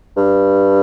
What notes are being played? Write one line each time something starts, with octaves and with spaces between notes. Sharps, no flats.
G2